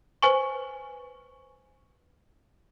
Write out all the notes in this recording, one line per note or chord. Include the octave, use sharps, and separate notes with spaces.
B4 C5 G#5 C#6